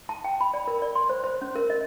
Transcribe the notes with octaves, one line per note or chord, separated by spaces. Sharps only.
A5
G5
B5
D5
A#4
D5
C6
C5
C5
C#4
A#4
D#5